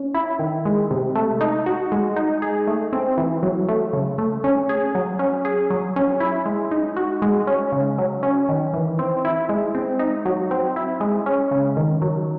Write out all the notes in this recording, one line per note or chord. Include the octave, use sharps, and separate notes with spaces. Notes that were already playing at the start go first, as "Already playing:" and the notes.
Already playing: C#4
E4
D#3
G#3
C3
A3
D#4
F#4
G#3
D#4
G#4
A3
C4
E3
F#3
A3
C#3
A3
C#4
G#4
F#3
C#4
G#4
F#3
C#4
E4
G#3
D#4
F#4
G#3
C#4
C#3
F#3
C#4
D#3
E3
C4
E4
G#3
C4
D#4
F#3
C4
E4
G#3
C#4
C#3
D#3
F#3